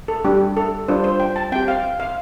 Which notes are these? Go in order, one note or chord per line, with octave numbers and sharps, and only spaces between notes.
A4
G3 D4 G4
A4
G3 D4 F4 C5
C5
G5
A5
C4 G4 G5
F5
F5